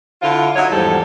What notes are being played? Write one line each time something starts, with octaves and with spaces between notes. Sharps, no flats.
D3 E4 F4
F#3 D#4 E4 C#5
E2 G#2 F3 G3 A4